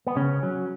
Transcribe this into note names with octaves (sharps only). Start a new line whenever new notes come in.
B3
C#3 C#4
F#3